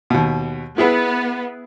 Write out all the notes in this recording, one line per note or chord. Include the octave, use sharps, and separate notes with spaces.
D#2 B2
B3 E4 G#4 B4